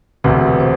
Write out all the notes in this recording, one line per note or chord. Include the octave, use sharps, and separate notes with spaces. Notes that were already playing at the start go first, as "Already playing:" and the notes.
E1 D2 C3 B4
C5